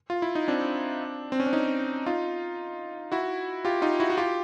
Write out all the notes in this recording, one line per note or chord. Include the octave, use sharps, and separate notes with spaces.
F4
E4
D#4
C4 D4
C4
C#4
D4
C#4 D#4
D#4 F4
E4 F#4
F4 G4
D#4 F4
E4 F#4
F#4
F4 G4